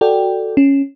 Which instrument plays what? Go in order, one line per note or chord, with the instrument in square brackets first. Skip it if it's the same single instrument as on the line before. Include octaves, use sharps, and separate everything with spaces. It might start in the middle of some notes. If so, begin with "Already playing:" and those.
[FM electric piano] F#4 A4 D5 G5
C#4